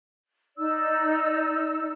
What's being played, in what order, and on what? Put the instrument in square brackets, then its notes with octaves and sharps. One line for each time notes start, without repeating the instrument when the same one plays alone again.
[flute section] D#4 D5 E6